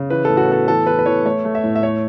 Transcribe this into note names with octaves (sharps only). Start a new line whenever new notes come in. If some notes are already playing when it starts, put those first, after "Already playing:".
Already playing: C#3
E3 B4
A2 A4
F#4
B3 A4
E3 A4
E3 B4
B4
E3 C#5
A3 C#5
A3
E5
A2
E5
A3 C#5